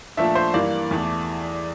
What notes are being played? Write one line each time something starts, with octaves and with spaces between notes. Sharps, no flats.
A#2 F3 A3 D4 E5
C5
G2 E3 A#3 D5
E2 E3 A3